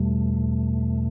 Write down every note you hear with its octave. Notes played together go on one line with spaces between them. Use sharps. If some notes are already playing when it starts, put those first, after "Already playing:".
Already playing: E2 B2 G3 A3